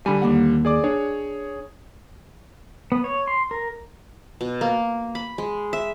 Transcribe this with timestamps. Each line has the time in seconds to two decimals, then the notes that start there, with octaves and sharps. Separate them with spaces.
0.06 D3 G3 G#5 B5
0.22 D#2 A#3 F#5
0.65 G#4 D5 D6
0.84 D4 G#4 C#5
2.92 B3
3.04 C#5
3.28 C6
3.51 A#4
4.41 B2
4.61 A#3
5.15 B5
5.38 G#3
5.73 E5